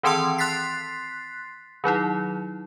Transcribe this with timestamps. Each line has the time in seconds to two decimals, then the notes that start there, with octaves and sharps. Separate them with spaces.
0.03 D#3 E3 C4 A5 C6 E6
0.38 C6 F#6 A6 B6 C7
1.84 D#3 F#3 D#4 E4